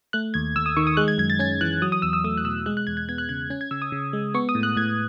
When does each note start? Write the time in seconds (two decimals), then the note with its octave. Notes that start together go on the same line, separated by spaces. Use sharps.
0.13 A3 F#6
0.34 D#2 G#6
0.56 D#2 E6
0.66 D#6
0.77 D#3 C#6
0.87 D#6
0.97 G#3 F#6
1.08 G#6
1.18 F#2 G#6
1.30 A6
1.39 C#4 G#6
1.61 E3 F#6
1.82 F#3 D#6
1.92 D#6
2.02 E2 E6
2.13 E6
2.24 A3 D#6
2.37 F#6
2.44 B2 E6
2.66 G#3 F#6
2.77 F#6
2.87 E2 G#6
2.97 G#6
3.09 B3 G#6
3.18 F#6
3.29 C#3 G#6
3.50 C#4 G#6
3.61 G#6
3.71 C#3 E6
3.82 D#6
3.92 C#3
4.13 G#3
4.34 B3 C#6
4.49 D#6
4.55 A2
4.63 F#6
4.77 A2 G#6